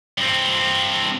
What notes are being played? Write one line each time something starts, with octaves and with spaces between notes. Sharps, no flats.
G2 C4